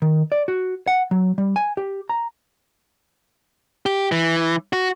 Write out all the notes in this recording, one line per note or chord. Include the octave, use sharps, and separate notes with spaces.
D#3
D5
F#4
F#5
F#3
G3
G#5
G4
A#5
G4
E3
F#4